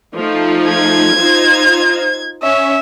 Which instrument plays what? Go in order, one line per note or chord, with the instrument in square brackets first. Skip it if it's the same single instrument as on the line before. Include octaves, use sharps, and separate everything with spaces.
[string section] F3 A3 D#4
[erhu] G#6
[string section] D#4 F4 C5
[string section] C#4 [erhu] E5